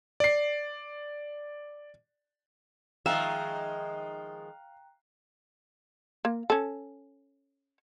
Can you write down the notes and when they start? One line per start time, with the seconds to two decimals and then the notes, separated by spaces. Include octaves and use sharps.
0.20 D5 C7
3.06 D#3 F3 G#3 E5 F5 G5 A#5 F#6
6.25 A#3
6.50 C#4 A4